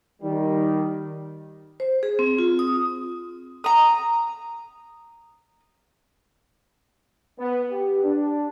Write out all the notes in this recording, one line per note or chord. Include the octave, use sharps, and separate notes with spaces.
D#3 G3
C5
G#4
C4
F4
D#6
A#5 D#6
B3
G4
D4